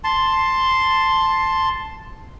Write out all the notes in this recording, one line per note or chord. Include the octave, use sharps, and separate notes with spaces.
A5 C6